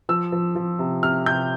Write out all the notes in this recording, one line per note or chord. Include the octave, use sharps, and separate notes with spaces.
F3 E6
F3
F3
C3
C3 F6
C3 G6